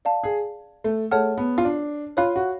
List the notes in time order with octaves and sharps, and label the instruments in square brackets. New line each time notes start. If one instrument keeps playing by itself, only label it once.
[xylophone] D5 F5 A5
[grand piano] G#4
A3
[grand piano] A3 [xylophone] G#4 C#5 F#5 A5 F6
[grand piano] B3
F4
D4
[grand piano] F4 [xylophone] C#5 F5 B5 F#6
[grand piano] F#4